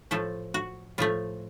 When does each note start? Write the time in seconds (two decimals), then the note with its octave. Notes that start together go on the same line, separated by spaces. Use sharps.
0.11 A2 F3 A3 A4
0.54 F#4
0.98 A2 F3 A3 F4